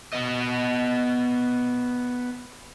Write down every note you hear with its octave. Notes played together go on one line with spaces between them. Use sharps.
B3 D#5